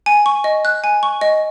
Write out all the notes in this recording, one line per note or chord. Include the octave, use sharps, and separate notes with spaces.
G#5
C#6
D#5
F#6
G#5
C#6
D#5